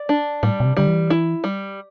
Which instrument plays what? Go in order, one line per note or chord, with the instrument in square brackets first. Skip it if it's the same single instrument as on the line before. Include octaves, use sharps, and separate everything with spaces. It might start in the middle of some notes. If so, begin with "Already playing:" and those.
Already playing: [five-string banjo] D5
D4
[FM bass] A2 [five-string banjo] G3
[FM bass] B2
C3
[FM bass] D3 [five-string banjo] G3
[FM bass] E3
[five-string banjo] E4
G3